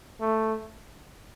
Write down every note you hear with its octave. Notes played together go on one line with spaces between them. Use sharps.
A3